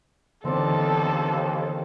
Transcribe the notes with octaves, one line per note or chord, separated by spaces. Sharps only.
D#2 D3 E3 B3 C4 A4 D5